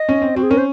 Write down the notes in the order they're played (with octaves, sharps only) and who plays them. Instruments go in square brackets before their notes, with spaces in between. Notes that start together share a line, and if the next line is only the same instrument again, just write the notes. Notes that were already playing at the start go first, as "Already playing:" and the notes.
Already playing: [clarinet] D#5
[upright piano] C#4
C4
[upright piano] C4 [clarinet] F#4
[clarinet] G#4
[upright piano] C#4 [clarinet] A#4
[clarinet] C5